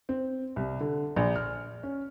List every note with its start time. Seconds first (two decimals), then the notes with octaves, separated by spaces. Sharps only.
0.09 C4
0.56 C2
0.80 D3
1.16 A#1
1.36 F6
1.83 C#4